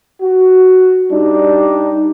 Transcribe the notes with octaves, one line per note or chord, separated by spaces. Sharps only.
F#4
G3 D4 D#4